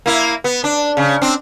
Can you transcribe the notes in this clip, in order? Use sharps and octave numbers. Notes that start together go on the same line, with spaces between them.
A#3 E4
B3
D4
C#3
C4 D4